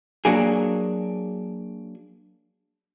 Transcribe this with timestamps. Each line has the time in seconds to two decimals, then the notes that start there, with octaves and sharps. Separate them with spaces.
0.25 F#3 A#3 D4 G#4